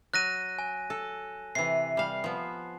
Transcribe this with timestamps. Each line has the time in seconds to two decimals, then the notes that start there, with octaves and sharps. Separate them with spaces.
0.14 F#3 F#6 A#6 D#7
0.59 G#5
0.90 A4
1.55 C3 E3 C7
1.97 G3 F5
2.24 F3 B3